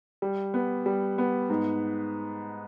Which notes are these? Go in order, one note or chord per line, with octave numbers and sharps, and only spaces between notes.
G3
B3
G3
B3
G#2